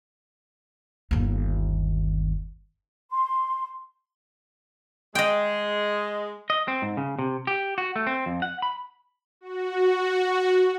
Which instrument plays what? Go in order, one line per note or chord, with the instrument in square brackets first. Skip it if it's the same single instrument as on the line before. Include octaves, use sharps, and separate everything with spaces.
[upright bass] G1 D#2
[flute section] C6
[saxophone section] G#3 [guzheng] D#5 G5
[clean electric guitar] D#5
C4
G#2
C#3
C3
G4
F#4
A3
C4
F2
F#5
B5
[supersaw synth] F#4